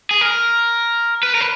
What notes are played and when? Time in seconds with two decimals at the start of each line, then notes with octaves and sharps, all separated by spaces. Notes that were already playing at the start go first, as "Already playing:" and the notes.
0.11 G#4
0.21 A#4
1.23 B4
1.35 A#4
1.41 B4